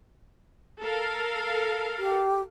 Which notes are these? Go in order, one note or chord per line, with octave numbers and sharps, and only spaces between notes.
A4 A#4 F5
G4